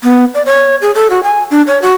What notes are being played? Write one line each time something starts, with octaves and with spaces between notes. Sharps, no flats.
B3
D5
C#5
G#4
A4
F#4
G#5
D4
C#5
F#4